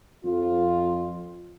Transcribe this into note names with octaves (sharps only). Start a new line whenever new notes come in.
F2 F4